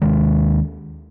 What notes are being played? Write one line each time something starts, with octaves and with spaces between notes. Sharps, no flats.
D#2 D#3 G#3